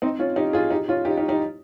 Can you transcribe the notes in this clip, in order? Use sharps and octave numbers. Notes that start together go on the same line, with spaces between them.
C4 D#4
C#4 F4
D#4 G4
F4 G#4
D#4 G4
C#4 F4
D#4 G4
D#4 G4
D#4 G4